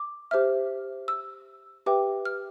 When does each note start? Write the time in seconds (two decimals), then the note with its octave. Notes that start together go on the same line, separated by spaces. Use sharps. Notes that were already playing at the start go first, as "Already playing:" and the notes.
Already playing: D6
0.31 G4 C5 E5 F6
1.08 E6
1.86 G4 B4 E5 G5 D6
2.25 F6